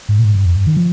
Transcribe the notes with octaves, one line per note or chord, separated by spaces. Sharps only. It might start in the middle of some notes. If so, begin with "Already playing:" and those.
G#2
A#2
G#2
G2
F2
G2
D#3
F3